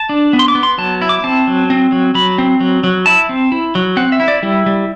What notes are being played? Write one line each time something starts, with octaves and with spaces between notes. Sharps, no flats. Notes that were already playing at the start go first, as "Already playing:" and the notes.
Already playing: A5
D4
B3
C6
D6
B3
C6
F#3 A5
E4
D6
C4 A5
F#3
C4
F#3
F#3 B5
C4
F#3
F#3
E4 A5
C4
E4
F#3
C4 F#5
E5
E4
D5
G3 E4
G3